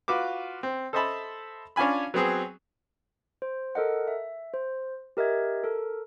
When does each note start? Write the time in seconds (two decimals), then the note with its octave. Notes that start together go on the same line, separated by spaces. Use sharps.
0.08 F4 F#4 B4 D6
0.63 C4
0.93 A4 C5 D#5 E5 A5 B5
1.76 C#4 D4 F4 G#5 B5
2.14 F#3 B3 C4 G#4
3.42 C5
3.75 A4 A#4 D#5 F#5
4.08 E5
4.54 C5
5.17 G4 A#4 D#5 E5 G#6
5.64 A4 A#4